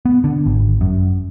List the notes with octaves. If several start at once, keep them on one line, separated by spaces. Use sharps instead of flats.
B3
D3
G#1
F#2